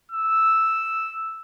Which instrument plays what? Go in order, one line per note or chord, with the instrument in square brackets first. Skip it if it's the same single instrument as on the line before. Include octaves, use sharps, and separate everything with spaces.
[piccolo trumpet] E6